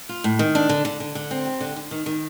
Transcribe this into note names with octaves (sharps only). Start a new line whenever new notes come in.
F4
A2
D#3
D4
D3
D3
D3
D3
C4
G4
D3
D3
D#3
D#3